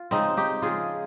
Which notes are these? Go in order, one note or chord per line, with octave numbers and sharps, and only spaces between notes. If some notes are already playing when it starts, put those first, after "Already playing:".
Already playing: F4
C#3 F3 G#3 C4 D#4
D#4 G4
C#3 F3 G#3 F4 G#4